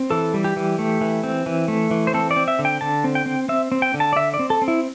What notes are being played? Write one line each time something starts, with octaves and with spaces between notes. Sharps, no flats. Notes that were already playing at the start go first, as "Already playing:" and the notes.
Already playing: C4
E3 A4
G3
G4
E3
A3
E3
C4
E3
A3
E3
C5
C4 A4
D5
C4
E5
D3
G5
D3 A5
C4
G5
C4
C4 E5
C4
G5
D3
A5
D5
D3 E5
D5
C4
A4
C4
E4